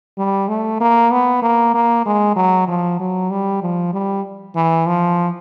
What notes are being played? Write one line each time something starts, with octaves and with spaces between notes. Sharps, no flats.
G3
A3
A#3
B3
A#3
A#3
G#3
F#3
F3
F#3
G3
F3
G3
E3
F3